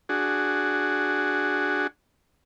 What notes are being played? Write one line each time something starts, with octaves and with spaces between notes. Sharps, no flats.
D4 F#4 G#4